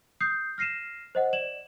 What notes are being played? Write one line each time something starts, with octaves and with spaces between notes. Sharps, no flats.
D#6 G6 C7
F6 A#6 C7 D#7 E7
C5 D#5 F#5
D5 E7 F#7